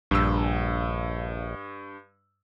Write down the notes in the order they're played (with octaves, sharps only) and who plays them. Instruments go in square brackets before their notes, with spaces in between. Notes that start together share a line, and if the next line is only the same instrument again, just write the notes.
[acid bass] A#1 [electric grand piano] G2 E6